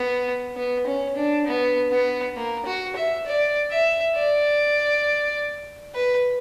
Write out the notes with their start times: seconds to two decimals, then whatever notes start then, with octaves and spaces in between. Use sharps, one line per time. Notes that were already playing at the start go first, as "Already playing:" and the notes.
Already playing: B3
0.57 B3
0.87 C#4
1.16 D4
1.47 B3
1.91 B3
2.36 A#3
2.66 F#4
2.96 E5
3.26 D5
3.71 E5
4.15 D5
5.95 B4